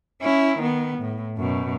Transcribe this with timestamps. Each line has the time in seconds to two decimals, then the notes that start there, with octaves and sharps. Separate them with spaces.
0.21 C#4 E4
0.58 D#3 B3
0.98 A2
1.37 F#2 B2